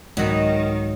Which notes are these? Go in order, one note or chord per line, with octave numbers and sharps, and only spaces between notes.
C2 G#2 D#3 F#3 G#3 C#5 D#5 B5